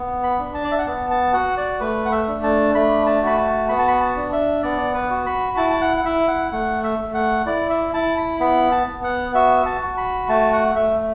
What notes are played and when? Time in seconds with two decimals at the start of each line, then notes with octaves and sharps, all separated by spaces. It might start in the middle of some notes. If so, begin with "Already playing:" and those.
Already playing: B3
0.23 B5
0.39 D4
0.54 A5
0.64 D5
0.71 E5
0.78 F#5
0.86 B3 A5
1.10 A5
1.33 F#4 F#5
1.57 D5
1.80 A3 B4
2.06 F#5
2.12 E5
2.28 D4
2.43 A5
2.75 A3 B5
3.06 A5
3.22 F#4 B5
3.37 A5
3.69 B3 B5
3.79 A5
3.88 B5
4.01 A5
4.16 D4
4.32 E5
4.63 B3 D5
4.94 B4
5.10 F#4
5.26 B5
5.57 E4 A5
5.70 A5
5.81 F#5
5.97 F#5
6.05 E4 E5
6.28 F#5
6.51 A3 F#5
6.84 E5
6.99 A3
7.14 F#5
7.46 E4 D5
7.70 E5
7.94 E4 A5
8.17 B5
8.40 B3 B5
8.72 A5
8.87 B3
9.04 F#5
9.34 F#4 E5
9.66 A5
9.81 F#4
9.97 B5
10.29 A3 A5
10.53 F#5
10.75 A3 E5